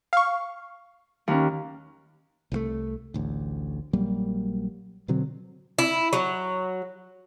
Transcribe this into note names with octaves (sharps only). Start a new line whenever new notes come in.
F5 C#6
D#2 C#4
C2 E3 A3
A1 D2
A#1 F#3 G3 A#3
B2 D3 F#3 C4
E4
F#3